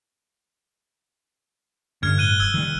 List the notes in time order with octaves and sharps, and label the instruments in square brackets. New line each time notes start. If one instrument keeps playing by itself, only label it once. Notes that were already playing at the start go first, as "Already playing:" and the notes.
[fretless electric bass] G2 [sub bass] D3 [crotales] F6 G#6
[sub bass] A2 [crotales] F#6 D#7 G7
[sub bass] F1 [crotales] E6 G#6
[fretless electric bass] D#3 G3